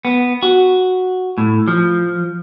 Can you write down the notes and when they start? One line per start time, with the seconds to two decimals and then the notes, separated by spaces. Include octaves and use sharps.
0.05 B3
0.43 F#4
1.38 A2
1.68 F3